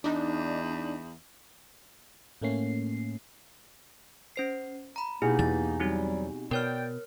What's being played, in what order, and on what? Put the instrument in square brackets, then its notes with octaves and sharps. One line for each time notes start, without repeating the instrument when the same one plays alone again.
[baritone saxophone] E2 [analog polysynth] D4 D#4
[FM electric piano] A2 A3 A#3 C#4 C7
[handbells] C#4 C5 C7
A#5 B5
[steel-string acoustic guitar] B2 G4 G#4 [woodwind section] A#3 D#4 [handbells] E4
[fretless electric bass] E2 E3 [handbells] A6
[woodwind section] F#3 G3 [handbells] C4 D#4 F#4
[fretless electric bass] B2 [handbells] A#4 C#5 F6 [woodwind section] D5 G5